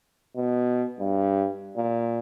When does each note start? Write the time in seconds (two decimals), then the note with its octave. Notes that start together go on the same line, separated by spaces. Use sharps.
0.37 B2
0.99 G2
1.77 A#2